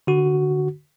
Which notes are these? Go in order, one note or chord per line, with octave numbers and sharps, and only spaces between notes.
D3 F#4